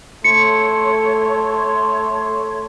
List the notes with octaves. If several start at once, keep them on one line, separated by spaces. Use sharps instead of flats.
A3 C#5 C6 C#7